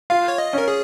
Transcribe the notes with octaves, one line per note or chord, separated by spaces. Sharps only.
F4 F5
C#5
D#5
C#4 A#4
G#4